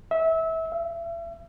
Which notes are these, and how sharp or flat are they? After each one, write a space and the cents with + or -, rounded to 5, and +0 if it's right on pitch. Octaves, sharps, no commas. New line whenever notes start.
E5 -25
E5 +35